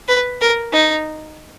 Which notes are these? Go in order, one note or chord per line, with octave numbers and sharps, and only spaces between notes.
B4
A#4
D#4